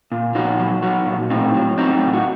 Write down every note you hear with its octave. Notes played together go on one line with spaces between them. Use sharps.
A#2
A#2 D#4 F#4
F#3
F#3 D#4 F#4
A#2
A2 C4 D#4
F#3
F#3 C4 D#4
A2
F#4